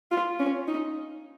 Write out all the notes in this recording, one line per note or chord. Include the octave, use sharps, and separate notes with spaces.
F4
C#4
D#4